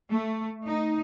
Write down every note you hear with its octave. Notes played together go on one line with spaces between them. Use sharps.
A3
D#4